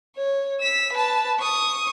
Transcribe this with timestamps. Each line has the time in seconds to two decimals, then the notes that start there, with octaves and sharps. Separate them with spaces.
0.17 C#5
0.61 E6 B6
0.93 B4 A5
1.40 C#6 D#6